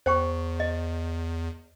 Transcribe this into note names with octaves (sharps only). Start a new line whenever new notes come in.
E2 C5 G5 C#6
D#5